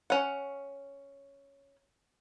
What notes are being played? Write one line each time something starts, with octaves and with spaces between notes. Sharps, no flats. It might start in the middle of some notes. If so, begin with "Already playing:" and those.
C#4 F#5